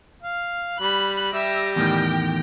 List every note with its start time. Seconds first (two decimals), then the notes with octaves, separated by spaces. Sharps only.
0.23 F5
0.80 G3 B5 F#6
1.33 G3 G4 E5 A#6
1.76 E2 A2 D#3 G5